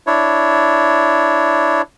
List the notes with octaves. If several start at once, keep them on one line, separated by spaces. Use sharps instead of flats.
D4 E4 C#5